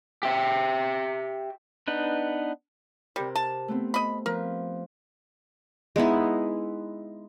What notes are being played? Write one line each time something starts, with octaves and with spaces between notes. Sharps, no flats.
G4 E5
B3 D4 D#4 B4
C3 G3 G4 A#4
A5
A3 B3 C4
D#5 B5
F3 A#4 B4
G#3 B3 D#4 E4